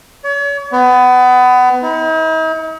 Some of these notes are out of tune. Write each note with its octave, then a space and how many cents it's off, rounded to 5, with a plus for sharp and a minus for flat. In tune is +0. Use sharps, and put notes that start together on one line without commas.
C#5 +40
B3 +25
D#4 +45